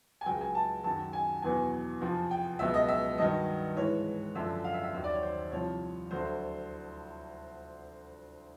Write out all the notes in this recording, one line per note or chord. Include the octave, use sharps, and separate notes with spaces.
G#5
C#2 C#3 F#3 G5
G#5
A5
F#2 D#3 F#3 A5
G#5
E2 B2 F#3 G#5
F2 C3 F3
G5
C#2 B2 F#3 E5
D#5
E5
G2 D#3 F#3 D#5
G#2 E3 C#5
F#2 D3 F3 E5
F5
E5
E5
D#2 D#3 F#3 E5
D5
C#5
C5
C2 C3 F3 C#5
D2 D3 F#3 C5